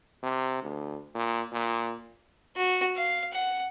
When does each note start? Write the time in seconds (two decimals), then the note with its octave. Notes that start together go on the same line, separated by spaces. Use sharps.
0.23 C3
0.62 D2
1.15 A#2
1.51 A#2
2.56 F#4
2.96 F5
3.33 F#5